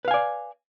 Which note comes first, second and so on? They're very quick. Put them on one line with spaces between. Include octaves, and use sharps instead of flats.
B4 F5 G#5 D5